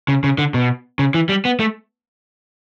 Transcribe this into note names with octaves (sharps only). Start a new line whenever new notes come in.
C#3
C#3
D3
B2
C#3
E3
G3
B3
A3